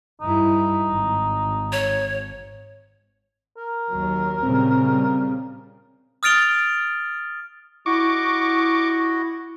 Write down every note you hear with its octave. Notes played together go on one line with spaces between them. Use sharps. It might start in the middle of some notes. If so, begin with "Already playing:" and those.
G2 D#4 E4
G#1
C#5
A#4
D#2 F#3
A#2 C#3 G3 C4
D#6 F6 A6 D7 F7 G7
E4 F#4 D#5 C#6 D6